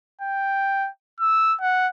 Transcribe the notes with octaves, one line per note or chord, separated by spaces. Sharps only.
G5
E6
F#5